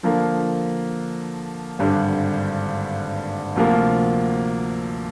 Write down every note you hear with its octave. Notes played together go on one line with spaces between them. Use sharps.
D3 F3 A#3
G#1 G2 D3 G3
D2 C3 F3 A#3